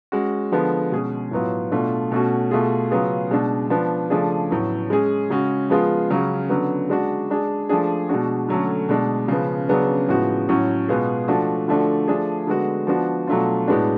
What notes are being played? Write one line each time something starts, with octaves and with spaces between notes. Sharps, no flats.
G#3 C#4 F#4
D3 F3 G#3 B3
B2 G#3 C#4 G#4
A2 F#3 B3 F4
B2 A3 D4 F4
B2 A3 C#4 F#4
B2 A3 F4 G#4
C#3 F#3 B3 F4 G#4
B2 G#3 D4
F3 B3 D4
C#3 F3 A3 D4 G#4
A2 F#3 B3
G#3 C#4 G#4
C#3 G#3 C#4 F#4
F3 G#3 B3 F4 G#4
C#3 F#3 C#4
D3 F#3 B3
G#3 D4 F#4
G#3 D4 G#4
F3 A3 D4 G#4
B2 G#3 D4 F#4
D3 F#3 A3 C#4
B2 G#3 D4
C#3 F3 B3
C#3 F#3 B3 D4 G#4
A2 F3 G#3 B3 F#4
A2 F#3 C#4 F#4
B2 G#3 B3 F4 G#4
F3 A3 D4 F#4
D3 F3 A3 D4 F#4
F3 A3 D4 G#4
D3 G#3 B3 F#4
F3 B3 D4 F#4
B2 F#3 A3 D4 F4
A2 G#3 B3 D4 F#4